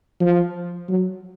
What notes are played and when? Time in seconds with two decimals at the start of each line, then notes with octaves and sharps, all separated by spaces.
0.21 F3
0.89 F#3